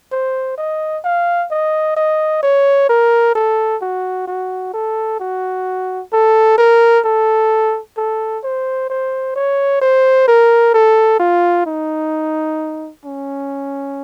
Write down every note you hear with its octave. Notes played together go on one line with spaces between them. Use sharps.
C5
D#5
F5
D#5
D#5
C#5
A#4
A4
F#4
F#4
A4
F#4
A4
A#4
A4
A4
C5
C5
C#5
C5
A#4
A4
F4
D#4
C#4